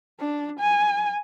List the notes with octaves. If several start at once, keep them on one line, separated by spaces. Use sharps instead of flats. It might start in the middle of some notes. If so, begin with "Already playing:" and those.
D4
G#5